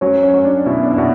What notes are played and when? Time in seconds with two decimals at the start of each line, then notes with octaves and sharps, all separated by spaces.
0.01 F#3 C#4
0.23 C#4
0.34 F#3
0.44 D4
0.66 B2 E4
0.83 D4
0.91 E4
0.98 B2 F#4